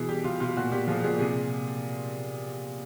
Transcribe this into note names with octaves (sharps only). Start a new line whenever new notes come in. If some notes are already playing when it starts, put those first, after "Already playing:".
Already playing: B2 E3 G#4
G3 G4
B2 F4
B2 F4
A#2 F#4
A#2 G4
F3 G#4
A#2 G#4
C3 G#4